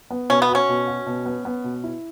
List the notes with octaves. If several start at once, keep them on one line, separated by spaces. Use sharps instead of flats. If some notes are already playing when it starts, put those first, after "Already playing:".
B3
B2 C#4
B3
F#4
C#4
B2
F#4
B2
B3
B3
B2
E4